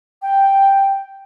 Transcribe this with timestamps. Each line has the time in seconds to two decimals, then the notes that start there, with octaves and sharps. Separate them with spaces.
0.22 G5